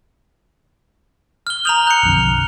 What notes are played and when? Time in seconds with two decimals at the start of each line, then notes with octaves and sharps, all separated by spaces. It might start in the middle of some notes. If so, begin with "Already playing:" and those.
1.47 F6 G7
1.65 A#5 D#6 G6 F7 F#7
1.87 F#6 C#7
2.03 B1 F2 D3